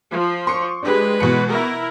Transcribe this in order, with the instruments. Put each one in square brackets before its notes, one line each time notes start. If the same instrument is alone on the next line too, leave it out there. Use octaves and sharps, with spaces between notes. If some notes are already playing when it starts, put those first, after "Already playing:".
[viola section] F3
[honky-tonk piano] C6 C#6 C#7
[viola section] G#3 B4 [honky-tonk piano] D4 G4
[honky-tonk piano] B2 E3 C#7
[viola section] E4 A#4